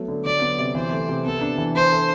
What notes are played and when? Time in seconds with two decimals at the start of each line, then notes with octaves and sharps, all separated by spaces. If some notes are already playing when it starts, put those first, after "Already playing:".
Already playing: F#3 A3 B3
0.08 D3
0.25 F#3 D5
0.42 B3
0.58 C3
0.75 E3 C5
0.92 A3
1.09 C3
1.25 B3 A4
1.41 D4
1.58 E3
1.75 D4 C5
1.92 A4